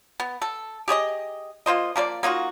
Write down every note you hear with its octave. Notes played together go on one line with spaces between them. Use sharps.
B3
A4
G4 G#4 C#5 D#5
A#3 F4 C5 D#5
F3 A#3 A4 D5
A#3 D#4 F4 F#4